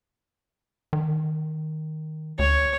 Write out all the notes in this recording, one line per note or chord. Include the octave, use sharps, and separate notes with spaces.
D#3
D2 C#5